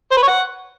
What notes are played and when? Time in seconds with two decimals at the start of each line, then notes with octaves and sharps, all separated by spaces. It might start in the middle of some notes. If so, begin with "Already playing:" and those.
0.12 C5
0.17 B4
0.22 C#5
0.28 F#5